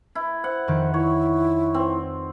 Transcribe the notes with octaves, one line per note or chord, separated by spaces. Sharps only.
E4
C5 F#5
F2 D#3 F#6
E4 C#5
C4